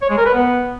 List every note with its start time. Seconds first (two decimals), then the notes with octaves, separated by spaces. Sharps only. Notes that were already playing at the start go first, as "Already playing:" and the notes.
0.02 C#5
0.10 G#3
0.18 A#4
0.26 B4
0.34 B3